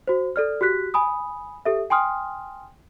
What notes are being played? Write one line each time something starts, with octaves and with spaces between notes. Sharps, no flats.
F#4 C5
A4 D5 F6
F#4 G4 F#6 B6
G#5 B5 D#6
G4 A4 E5
G5 G#5 C6 D#6 F6